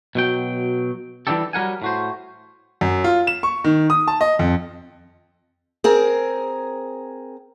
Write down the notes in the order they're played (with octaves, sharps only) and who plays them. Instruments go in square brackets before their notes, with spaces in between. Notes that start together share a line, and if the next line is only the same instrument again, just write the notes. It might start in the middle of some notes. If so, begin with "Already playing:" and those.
[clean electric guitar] B2 F#3 G5
E3 G3 D4 G4 A4
F#3 G3 A#4 F#5 G#5
A2 F#4 C5
[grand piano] F#2
F4
E7
C#6
D#3
D#6
A5
D#5
F2
[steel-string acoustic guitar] C4 G#4 A#4